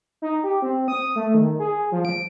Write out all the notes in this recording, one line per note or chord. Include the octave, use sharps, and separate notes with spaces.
D#4
G4
C4
D#6
A3
D#3
G#4
F3
D7